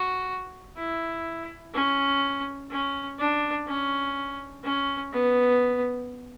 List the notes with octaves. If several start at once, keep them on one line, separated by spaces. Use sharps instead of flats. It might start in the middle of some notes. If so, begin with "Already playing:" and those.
Already playing: F#4
E4
C#4
C#4
D4
C#4
C#4
B3